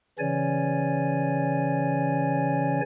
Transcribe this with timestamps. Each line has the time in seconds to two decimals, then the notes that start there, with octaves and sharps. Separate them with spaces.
0.19 C#3 E3 C#4 C#5 D5 G#5